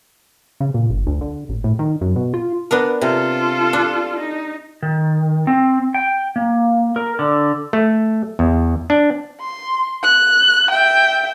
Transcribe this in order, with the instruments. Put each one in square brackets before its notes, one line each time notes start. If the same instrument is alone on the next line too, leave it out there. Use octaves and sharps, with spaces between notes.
[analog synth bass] C#3
A#2
G1
D2
D3
A1
A2
D#3
F#2
B2
F4
[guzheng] B3 D4 A#4
[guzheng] C3 [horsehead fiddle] F4 A4
[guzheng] D4
[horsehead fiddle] D#4
[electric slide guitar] D#3
C4
G5
A#3
A#4
D3
[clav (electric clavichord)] A3
E2
D4
[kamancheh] C6
F#6
E5 G5